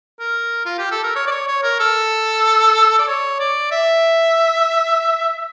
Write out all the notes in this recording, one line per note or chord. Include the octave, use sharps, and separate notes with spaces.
A#4
F4
G4
A4
A#4
C#5
D5
C#5
C#5
A#4
A4
D5
C#5
D5
E5